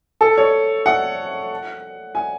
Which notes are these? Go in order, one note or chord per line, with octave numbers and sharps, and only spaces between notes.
A4
C#5
F#5
G#5